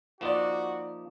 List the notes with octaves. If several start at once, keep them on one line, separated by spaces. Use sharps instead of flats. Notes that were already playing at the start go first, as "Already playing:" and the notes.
F3 A#3 D#4 F#4 D5 E7